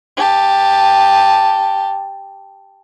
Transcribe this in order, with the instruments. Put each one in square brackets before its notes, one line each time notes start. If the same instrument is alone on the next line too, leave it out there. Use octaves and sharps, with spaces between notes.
[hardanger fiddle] G4 A5